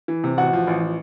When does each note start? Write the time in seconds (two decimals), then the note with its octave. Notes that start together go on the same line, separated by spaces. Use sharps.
0.08 E3
0.24 C3
0.37 A1 F#4 F#5
0.53 F3
0.67 A1
0.83 F3